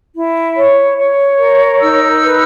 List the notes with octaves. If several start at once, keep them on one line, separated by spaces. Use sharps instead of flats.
E4
C#5
C#5
A#4
D#4 E6
B4